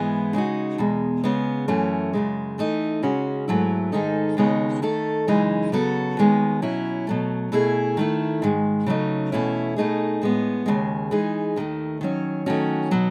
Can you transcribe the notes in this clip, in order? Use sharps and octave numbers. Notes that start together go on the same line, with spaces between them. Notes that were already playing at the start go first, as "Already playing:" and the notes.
Already playing: G#2 E3 G#3 B3 E4
C#3 G#3 D#4 F#4
E2 B2 G#3
C#3 G#3 B3
F#2 E3 A3 C#4
F#2 C#3 G#3
E3 A3 D#4
C#3 G#3 C#4 F#4
G#2 F#3 A3 E4
G#2 D#3 G#3 D#4 A4
D#2 C#3 G#3 B3 D#4
D#3 A3 D#4 A4
F#2 C#3 E3 G#3 D#4
C#3 F#3 B3 F#4 A4
D#2 D#3 G#3 B3
B2 F#3 C#4 E4
B2 F#3 A3
B2 A3 E4 G#4
D#3 A3 E4
G#2 D#3 G#3
C#3 F#3 A3 D#4
E2 B2 A3 C#4 E4
B2 A3 D#4 G#4
A2 G#3 B3
D#2 C#3 G#3
E3 G#3 D#4 G#4
D#2 D#3 A3
D#3 F#3 C#4
D#3 F#3 A3 C#4 F#4
B2 F#3 B3